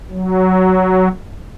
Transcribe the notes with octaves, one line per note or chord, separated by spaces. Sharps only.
F#3